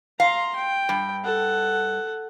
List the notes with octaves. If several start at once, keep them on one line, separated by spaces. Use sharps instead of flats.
F5 A#5 C6
G5
G2
A4 F#5